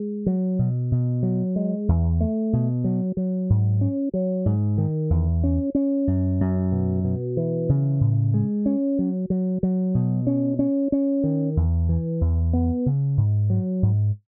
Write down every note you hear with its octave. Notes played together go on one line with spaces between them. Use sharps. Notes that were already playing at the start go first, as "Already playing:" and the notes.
Already playing: G#3
F#3
B2
B2
F#3
G#3
E2
A3
B2
F#3
F#3
G#2
C#4
F#3
G#2
D#3
E2
C#4
C#4
F#2
F#2
B2
B2
E3
C#3
A2
G#3
C#4
F#3
F#3
F#3
B2
C#4
C#4
C#4
D#3
E2
E3
E2
B3
C#3
G#2
F#3
G#2